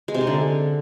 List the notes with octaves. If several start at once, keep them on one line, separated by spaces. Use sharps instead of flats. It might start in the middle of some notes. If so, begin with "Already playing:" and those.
G#3
C3
D#4
D3